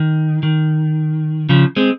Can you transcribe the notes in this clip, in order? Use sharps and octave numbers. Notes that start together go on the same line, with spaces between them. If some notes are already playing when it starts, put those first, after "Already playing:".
Already playing: D#3
D#3
C#3 F3
G#3 C4